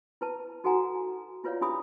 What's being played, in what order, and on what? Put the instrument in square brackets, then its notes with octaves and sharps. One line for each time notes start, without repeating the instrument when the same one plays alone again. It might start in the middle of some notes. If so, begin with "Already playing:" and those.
[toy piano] E4 B4 A5
D#4 F#4 A4 F#5 G#5 A#5
E4 F4 B4 C#5 D5 F5
D4 E4 G4 G#4 B5 D#6